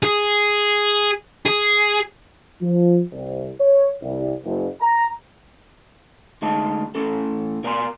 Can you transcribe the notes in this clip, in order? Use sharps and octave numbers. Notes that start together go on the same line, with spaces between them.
G#4
G#4
F3
C2
C#5
C2
F#1
A#5
D2 G#3 D#4 A5
A2 C#4 A4
B2 A#4 D5 G#5 A#5 C6